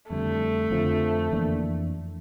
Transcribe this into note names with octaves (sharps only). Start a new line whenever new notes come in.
F2 D3 G3 A3
F2 D3 F3
F2 E3 A#3 D4